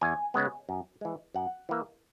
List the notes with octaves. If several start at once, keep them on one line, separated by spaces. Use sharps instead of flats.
E2 G#5
C#3 G#3 B3
F#2
E3 G#3
F#2 F#5
E3 A#3